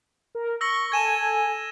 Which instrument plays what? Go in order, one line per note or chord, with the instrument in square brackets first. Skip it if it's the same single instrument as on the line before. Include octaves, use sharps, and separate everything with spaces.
[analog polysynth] A#4
[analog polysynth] C#6 [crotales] E6 A#6 F#7
[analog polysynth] A4 G#5 [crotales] G#6 D#7 E7